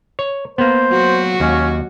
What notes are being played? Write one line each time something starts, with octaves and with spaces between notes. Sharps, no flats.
C#5
A#3 B3 C5
F#3 F#4
D#2 C#4